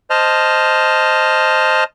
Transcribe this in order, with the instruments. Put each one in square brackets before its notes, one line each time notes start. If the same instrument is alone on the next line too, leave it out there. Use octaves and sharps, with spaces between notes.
[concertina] C5 D#5 A5 F6